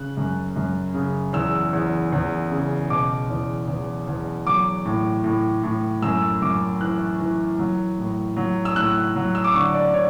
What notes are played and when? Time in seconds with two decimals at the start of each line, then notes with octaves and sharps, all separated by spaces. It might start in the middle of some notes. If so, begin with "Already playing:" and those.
Already playing: C#3 F#6
0.17 F#2
0.56 F#2
0.94 C#3
1.33 E2 E6
1.73 E2
2.12 E2
2.52 C#3
2.89 B2 D6
3.30 E2
3.68 E2
4.07 E2
4.46 F#3 D6
4.85 A2
5.24 A2
5.63 A2
6.02 F#2 E6
6.42 F#2 D6
6.81 E3 F#6
7.20 E3
7.59 F#3
7.98 A2
8.37 F#3
8.65 E6
8.76 A2 F#6
9.16 F#3
9.35 E6
9.44 D6
9.54 D3 C#6
9.74 D5
9.93 D3 C#5